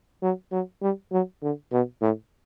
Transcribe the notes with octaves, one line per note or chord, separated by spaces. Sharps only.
F#3
F#3
G3
F#3
D3
B2
A2